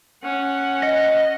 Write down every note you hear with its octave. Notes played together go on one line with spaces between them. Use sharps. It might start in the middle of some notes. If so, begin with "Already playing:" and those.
C#4 F#5
D#5